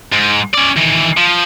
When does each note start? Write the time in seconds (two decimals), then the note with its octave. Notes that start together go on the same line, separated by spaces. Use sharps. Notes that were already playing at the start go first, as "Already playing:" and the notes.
0.13 G#2
0.54 C#4 D5
0.77 D#3 E3
1.17 F3